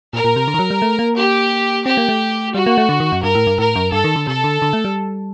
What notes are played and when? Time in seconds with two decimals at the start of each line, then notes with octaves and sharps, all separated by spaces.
0.13 A#2 A#4
0.24 A#2
0.36 C3
0.48 D3
0.54 D#3
0.59 F#3
0.71 G3
0.82 A3
0.99 A#3
1.17 G4
1.85 C4 G4
1.97 A#3
2.09 A3
2.54 G3 F#4
2.66 A#3
2.78 A3
2.89 D3
3.00 D#3
3.12 F#2
3.23 G2 A#4
3.35 A2
3.47 G2
3.58 A2 A#4
3.76 F#2
3.92 G2 A4
4.04 D#3
4.16 D3
4.27 C3 A4
4.44 D3
4.62 D3
4.73 A3
4.85 G3